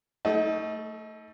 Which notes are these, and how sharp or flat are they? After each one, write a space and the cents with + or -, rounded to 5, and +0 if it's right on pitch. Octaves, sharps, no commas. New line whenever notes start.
A3 +15 D#4 +30 A4 -35